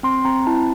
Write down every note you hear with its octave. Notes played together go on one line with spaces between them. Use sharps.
C4 C6
C4 A#5
E4 A5